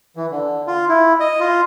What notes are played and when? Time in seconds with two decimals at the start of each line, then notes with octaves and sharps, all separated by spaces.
0.16 E3
0.31 D3
0.67 F4
0.89 E4
1.20 D#5
1.40 F4